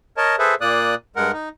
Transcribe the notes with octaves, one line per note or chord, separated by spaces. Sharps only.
A#4 C#5 D#5 A5
G#4 A4 B4 C5 E5
A#2 A#3 D5 D#6 F#6
G2 G#3 A#4 F#5
D#4